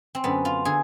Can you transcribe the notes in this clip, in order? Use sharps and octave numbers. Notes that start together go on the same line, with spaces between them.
C4
F#2 D3 B3
F4
D3 G#4